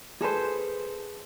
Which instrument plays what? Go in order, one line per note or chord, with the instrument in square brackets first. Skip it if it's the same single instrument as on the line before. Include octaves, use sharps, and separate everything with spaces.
[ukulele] G#4 A4 B4 C5